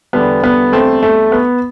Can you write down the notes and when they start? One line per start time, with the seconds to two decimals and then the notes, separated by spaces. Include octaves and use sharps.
0.13 E2 D3 G3 B3
0.43 B3
0.72 A3 C4
1.03 A3
1.32 B3